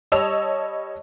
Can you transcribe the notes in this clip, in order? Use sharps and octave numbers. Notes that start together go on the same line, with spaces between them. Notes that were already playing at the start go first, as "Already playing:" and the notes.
G3 C#5 D#5 A5 E6 F7